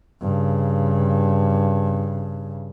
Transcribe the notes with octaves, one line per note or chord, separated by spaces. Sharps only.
G2 C#3